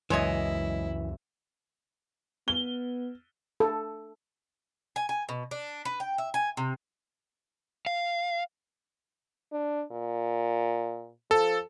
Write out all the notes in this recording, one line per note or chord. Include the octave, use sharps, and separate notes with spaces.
C#2 F#2 E3 G#3 E4 C#5 D#5
B3 G7
A4
G#5
G#5
B2
D4
B4
G5
E5
G#5
C3
F5
D4
A#2
F3 A4